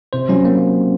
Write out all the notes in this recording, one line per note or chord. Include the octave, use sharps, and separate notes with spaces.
C3 C5
F#3 C#4
A#3 C#4